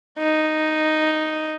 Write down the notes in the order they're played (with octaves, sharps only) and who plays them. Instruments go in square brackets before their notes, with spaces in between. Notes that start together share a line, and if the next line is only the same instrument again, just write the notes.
[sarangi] D#4